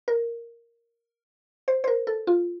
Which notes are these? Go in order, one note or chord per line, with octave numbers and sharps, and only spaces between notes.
A#4
C5
C5
A#4
A4
F4